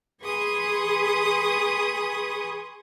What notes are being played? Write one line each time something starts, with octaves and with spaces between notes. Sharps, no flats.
G#4 B4 G#5 C6 C#6 D#6